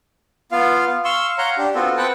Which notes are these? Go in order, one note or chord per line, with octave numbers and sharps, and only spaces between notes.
B3 F4 F5
F5 C6 C#6 E6
C#5 F5 F#5 A#5 C6
D4 G4
B3 C4 F4 F#4 A4
C4 B4 F#5 G5 A5